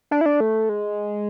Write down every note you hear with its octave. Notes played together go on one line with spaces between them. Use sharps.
D4
E4
D4
A3
G#3